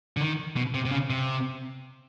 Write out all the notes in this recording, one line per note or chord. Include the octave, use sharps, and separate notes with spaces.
D3
D#3
B2
C3
C3
C#3
C3